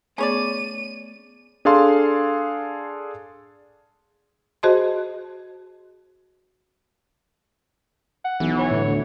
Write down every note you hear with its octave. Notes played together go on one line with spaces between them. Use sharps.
A3 B3 C#4 G#4 C#5 D5 D#7
D4 G#4 A4 F5 C6
F#4 G#4 C5 D#5 A5 C6
F#5
B1 E3
C#5
A2 D3
D2